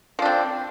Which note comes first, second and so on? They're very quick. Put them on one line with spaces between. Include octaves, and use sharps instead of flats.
F3 D4 C4